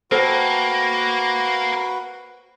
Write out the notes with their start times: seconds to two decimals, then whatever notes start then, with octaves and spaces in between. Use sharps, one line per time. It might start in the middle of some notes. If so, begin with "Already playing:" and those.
0.12 A#3 F#4 A4 B4 C5 G5